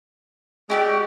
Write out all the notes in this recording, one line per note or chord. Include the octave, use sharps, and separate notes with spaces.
G#3 E4 F#4 G4 D5